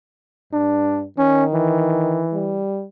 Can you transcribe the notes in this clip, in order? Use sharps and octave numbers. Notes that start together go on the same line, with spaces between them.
G2 D4
D#3 C#4
E3
G3